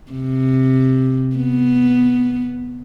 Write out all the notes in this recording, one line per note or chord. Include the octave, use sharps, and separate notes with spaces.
C3
B3